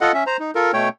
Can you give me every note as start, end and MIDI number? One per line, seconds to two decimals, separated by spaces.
0.01 0.12 65
0.01 0.12 69
0.01 0.12 75
0.01 0.12 78
0.14 0.24 61
0.14 0.24 76
0.27 0.37 72
0.27 0.37 82
0.40 0.51 63
0.55 0.71 65
0.55 0.71 69
0.55 0.71 70
0.73 0.89 47
0.73 0.89 57
0.73 0.89 73
0.73 0.89 79